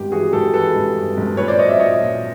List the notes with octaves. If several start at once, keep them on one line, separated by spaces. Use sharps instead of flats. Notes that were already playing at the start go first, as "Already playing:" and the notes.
Already playing: G#1 G2 G4
E3 F#4 G#4
G#1 G4 A4
E3 A4 B4
G#1
G2
G#1
A#2 B4 C#5
C5 D5
F#3 C#5 D#5
D5 E5
A#1 C#5 D#5
A#1